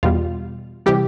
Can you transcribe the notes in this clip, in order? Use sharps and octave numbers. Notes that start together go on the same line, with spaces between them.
E2 B2 G3 F4
C3 E3 G3 G4